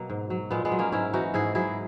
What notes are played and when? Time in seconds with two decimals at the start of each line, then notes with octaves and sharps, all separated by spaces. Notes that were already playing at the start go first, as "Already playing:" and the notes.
Already playing: B2 F#3 A#3
0.10 G#2
0.30 F#3
0.51 A#2 G#3 B3
0.65 G#3 B3
0.72 F#3
0.79 A#3 C#4
0.92 G#2 C#4 E4
1.13 E3 D#4 F#4
1.34 G#2 E4 G#4
1.55 F#3 E4 G#4